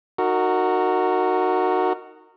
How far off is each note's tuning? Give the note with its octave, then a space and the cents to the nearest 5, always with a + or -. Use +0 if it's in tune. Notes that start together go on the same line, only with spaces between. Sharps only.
D#4 +0 F#4 +0 A#4 -25